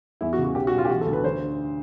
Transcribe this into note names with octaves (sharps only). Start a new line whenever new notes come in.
E2 E4
F#4
C#3
F#4
B1 G4
F#4
B1
F4
G4
E3 F#4
A4
D2
B4
D3 C5